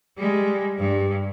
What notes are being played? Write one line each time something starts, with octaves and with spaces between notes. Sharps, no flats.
G3 G#3
G2